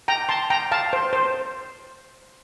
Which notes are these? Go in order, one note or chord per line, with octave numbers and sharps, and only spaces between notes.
G5 A#5
A5 C6
G5 A#5
F5 A5
C5
C5